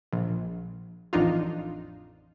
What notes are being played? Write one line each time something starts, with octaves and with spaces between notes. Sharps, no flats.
A#1
A1 F2 D4 D#4 F4